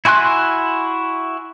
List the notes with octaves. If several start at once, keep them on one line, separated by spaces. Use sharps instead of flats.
E4 F#4 G#5 C6 F#6